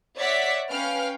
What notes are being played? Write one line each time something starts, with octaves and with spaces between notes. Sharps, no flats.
C#5 D5 E5 F#5 B6
C#4 B4 F5 G5 F6 D7